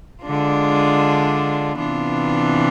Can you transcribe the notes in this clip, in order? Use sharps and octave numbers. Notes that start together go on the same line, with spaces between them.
D3 G#3 D4 F4
C3 E3 B3 D4 F4